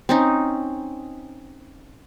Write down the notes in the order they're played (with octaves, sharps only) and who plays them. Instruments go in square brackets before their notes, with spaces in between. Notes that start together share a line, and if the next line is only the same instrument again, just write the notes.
[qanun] C4 C#4 D#4